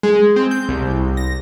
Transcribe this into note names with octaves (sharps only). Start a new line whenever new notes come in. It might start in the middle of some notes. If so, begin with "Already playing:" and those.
G#3
C4
G6
C2
A#6